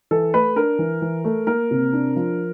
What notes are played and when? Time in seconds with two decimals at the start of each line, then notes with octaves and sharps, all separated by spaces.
0.11 E3 A4
0.34 A3 B4
0.56 D4 A#4
0.79 E3
1.02 E3
1.25 A3
1.47 A#3 A#4
1.71 C3
1.93 D4
2.16 F3